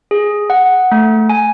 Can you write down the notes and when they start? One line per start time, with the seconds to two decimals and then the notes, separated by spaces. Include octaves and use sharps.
0.11 G#4
0.50 F#5
0.92 A3
1.29 G#5